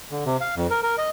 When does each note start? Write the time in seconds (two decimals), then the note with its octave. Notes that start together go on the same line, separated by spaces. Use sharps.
0.11 D3
0.26 C3
0.41 F5
0.56 F2
0.70 A#4
0.83 A#4
0.98 D#5